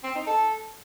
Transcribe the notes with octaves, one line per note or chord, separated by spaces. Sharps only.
C4
D#4
A4